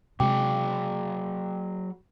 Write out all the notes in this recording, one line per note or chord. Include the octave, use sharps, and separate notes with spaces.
C3 F#3 G#3 F#4 G#4 G5 D6